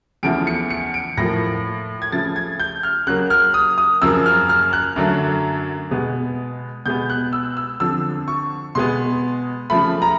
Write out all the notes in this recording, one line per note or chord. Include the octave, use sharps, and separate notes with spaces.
E2 C#3 F3 A3 D7
C#7
C#7
D7
A2 F3 A#3 A#6
G#6
C#3 F3 A3 A6
G#6
G6
F6
C#3 F#3 A#3 F#6
F6
D#6
D#6
F#2 C#3 F3 A#3 E6
F6
F6
F#6
F#2 D3 F#3 A3
B2 G#3 B3
B2 G#3 B3 G6
F#6
E6
E6
F2 D3 F3 E6
C#6
B2 G#3 B3 C6
C#3 F3 A3 B5
A#5